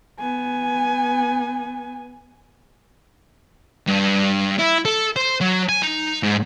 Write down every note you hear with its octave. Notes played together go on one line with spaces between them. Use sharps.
B3 G#5
G2
E4
A4
C5
F#3
G#5
D#4
G#2